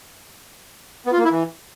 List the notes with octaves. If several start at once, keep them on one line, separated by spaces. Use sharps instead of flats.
B3
F4
A#3
E4
E3